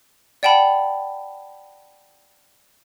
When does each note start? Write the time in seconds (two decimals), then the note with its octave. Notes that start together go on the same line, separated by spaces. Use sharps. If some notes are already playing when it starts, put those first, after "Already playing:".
0.43 D5 F#5 G5 A5 B5